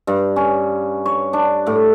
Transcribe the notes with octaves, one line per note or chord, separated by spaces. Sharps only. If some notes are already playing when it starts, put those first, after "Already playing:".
G2
C#4
C#5
D4
A2